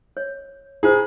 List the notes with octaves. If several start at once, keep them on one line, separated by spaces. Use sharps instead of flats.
C#5
E4 F4 G#4 C5